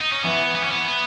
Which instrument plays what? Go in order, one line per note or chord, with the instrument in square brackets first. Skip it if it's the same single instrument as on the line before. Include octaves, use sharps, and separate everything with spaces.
[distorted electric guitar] D#4
C#4
[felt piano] E3 [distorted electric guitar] B3
[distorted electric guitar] B3
C#4
B3
B3